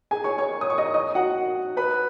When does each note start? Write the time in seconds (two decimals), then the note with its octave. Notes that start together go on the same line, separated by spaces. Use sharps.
0.11 G#4 G#5
0.24 C#5 C#6
0.38 C#5 C#6
0.61 D#6
0.70 C#6
0.78 D#5 D#6
0.94 D#5 D#6
1.15 F#4 F#5
1.77 B4 B5